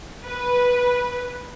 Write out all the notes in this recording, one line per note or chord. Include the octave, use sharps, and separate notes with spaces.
B4